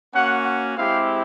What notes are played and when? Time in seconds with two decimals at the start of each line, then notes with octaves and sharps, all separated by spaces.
0.13 A#3 C#4 F#4 F#5
0.45 F#5
0.76 G#3 C4 E4 G4 F5